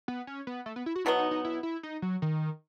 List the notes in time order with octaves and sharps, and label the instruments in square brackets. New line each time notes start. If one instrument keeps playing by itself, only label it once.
[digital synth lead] B3
C#4
B3
A3
B3
E4
F#4
[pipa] B2 F#3 B3 [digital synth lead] E4
[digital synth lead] D#4
D#4
E4
E4
D#4
F#3
D#3